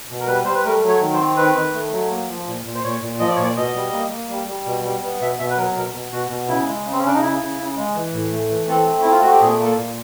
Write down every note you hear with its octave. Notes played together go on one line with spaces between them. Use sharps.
B2
A#4
G3 B4
G3 C5
B4
A3 A#4
F#3
C#5
D#3
C5
C4
D#3 B4
D#3
A3
F#3
A#3
F3
A#2
A#2
C5
A#2 C#5
A#2
F3 D#5
D5
A#2 C#5
D5
B2 D#5
G3
A#3
A#3
G3
G3
B2
G3
B3
B2 E5
B2 E5
B4
F#3 A#4
B2 A#4
B2
B2 F#4
B2
C#3 E4
G#3
C#3
C4
C#4
C#3 D4
D#4
C#3 E4
C#3
C#3
G#3
E3
A2
A3
E3
C4 A4
A3
C4 E4
F4
A3 F#4
G4
A#2 G#4
A#3 A4
A#2